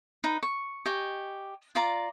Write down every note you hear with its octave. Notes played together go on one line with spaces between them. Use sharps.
D#4 B4
C#6
G4 D#5 G#5 C#6
F4 D5 A#5